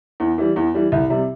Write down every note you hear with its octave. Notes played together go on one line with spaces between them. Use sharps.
E2
E3 G3
E2
E3 G3
C2
C3 G3